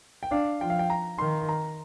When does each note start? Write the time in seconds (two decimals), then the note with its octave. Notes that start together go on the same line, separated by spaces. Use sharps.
0.23 G5
0.31 D4 F5
0.60 F3 G5
0.70 F5
0.79 G5
0.90 A#5
1.18 D#3 C6
1.49 A#5